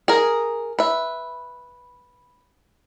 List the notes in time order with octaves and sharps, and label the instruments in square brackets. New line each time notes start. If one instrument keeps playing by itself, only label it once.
[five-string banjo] G#4 A#4
B4 E5